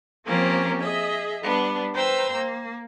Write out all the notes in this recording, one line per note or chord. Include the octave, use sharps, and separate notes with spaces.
F3 A#3 C4 C#4 G4 A#4
G#4 D#5 E5
G3 B3 D4
B4 C5 G5 A#5 E6
A#3